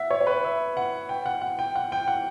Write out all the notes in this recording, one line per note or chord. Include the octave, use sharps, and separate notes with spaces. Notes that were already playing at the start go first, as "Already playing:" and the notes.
Already playing: E5 F#5
C#5
C#5
B4
E5
F#5
G5
F#5
F#5
G5
F#5
G5
F#5